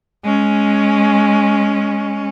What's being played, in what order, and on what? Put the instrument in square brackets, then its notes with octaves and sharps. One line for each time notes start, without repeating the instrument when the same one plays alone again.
[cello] G#3 C#4